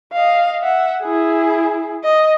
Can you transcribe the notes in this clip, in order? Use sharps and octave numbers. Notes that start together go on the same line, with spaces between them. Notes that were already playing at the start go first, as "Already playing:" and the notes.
D#5 F5
E5 F#5
E4 G#4
D#5